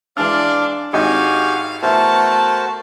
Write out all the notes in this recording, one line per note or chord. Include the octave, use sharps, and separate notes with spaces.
E3 G#3 D4 D5 F5 F6
G#1 D#4 F#4 G4 F5 G#5
E2 A3 F#4 A#4 C5 A5